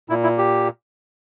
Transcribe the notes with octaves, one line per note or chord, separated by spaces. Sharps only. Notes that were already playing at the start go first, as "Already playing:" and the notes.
A#2 E4
E4
G4